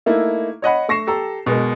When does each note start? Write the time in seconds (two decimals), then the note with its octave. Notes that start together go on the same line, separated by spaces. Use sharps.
0.06 A3 A#3 D#4 E4
0.62 C#5 D#5 F#5 B5
0.89 A3 C#6 A#6 C7 E7
1.07 G4 A4 A#5
1.46 B2 G#3 B3 F#4 A#4